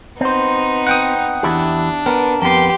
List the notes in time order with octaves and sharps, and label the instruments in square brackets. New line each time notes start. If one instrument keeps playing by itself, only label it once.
[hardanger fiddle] B3 D#4 [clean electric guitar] C4 C5
[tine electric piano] F#5 G5 D#6
[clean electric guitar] E2 E4 G4 [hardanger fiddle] D4
[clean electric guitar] B3 [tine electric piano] A#4
[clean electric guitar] F2 B3 [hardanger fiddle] G4 C6